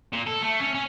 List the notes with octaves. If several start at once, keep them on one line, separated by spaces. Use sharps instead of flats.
A#2
A4
A3
C#4
C#4